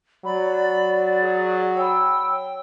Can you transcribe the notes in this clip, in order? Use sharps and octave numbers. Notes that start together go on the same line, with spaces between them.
F#3 D5 B5
G#4
C#5 G5 B5 E6